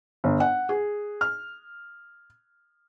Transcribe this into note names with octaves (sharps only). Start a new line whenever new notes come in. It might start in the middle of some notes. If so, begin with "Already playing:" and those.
G1
F#5
G#4
F6